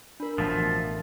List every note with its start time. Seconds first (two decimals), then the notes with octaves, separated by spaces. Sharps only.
0.20 D4 A#4 B5
0.38 A1 B2 E3 F3 A3 A6